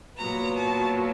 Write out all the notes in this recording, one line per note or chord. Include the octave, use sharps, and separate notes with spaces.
A#2 F#3 B3 A#5
A5